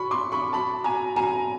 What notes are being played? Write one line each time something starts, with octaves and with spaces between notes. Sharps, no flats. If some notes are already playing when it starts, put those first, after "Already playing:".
Already playing: B5 C#6
C6 D6
B5 C#6
A5 B5
G#5 A#5
G#5 A#5